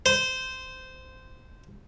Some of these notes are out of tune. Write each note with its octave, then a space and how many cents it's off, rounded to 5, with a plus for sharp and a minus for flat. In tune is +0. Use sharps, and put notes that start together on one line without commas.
C5 -15